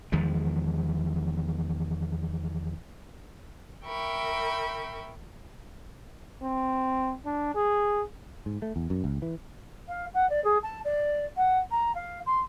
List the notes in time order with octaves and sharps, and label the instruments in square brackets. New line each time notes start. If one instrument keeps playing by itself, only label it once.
[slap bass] E2 D#3 F3 G#3
[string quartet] A#4 E5 G5 B5 C#6
[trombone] C4
D4
G#4
[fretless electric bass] G#2
A3
E2
F#2
C#2
E3
[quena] F5
F#5
D5
G#4
A5
D5
F#5
A#5
F5
C6